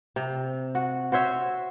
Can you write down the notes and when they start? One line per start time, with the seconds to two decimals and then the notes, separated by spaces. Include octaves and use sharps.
0.16 C3
0.75 F#4
1.12 F#4 C5 C#5 E5